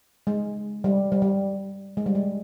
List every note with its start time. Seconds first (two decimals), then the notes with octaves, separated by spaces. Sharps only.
0.27 G#3
0.84 G3
1.12 G3
1.22 G3
1.97 G#3
2.06 G3
2.15 G#3